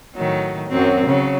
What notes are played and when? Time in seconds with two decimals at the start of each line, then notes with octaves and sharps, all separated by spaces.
0.16 A2 D#3 F#3
0.69 F#2 F#3 C4
1.06 C#3 F#3